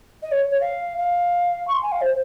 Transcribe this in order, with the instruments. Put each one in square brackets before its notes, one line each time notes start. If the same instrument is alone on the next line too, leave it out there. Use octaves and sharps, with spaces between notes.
[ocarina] D#5
C#5
C#5
F5
F5
C#6
C6
G#5
F5
C5